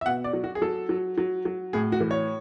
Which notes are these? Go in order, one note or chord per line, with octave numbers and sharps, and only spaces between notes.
E5
B2 F#5
D5
F#3
F#4
G#4
F#3 A4
F#3
F#3
F#3
A2 G#4
F#4
E3
C#5